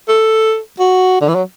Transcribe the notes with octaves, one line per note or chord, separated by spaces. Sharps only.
A4
F#4
D3
E3
F#3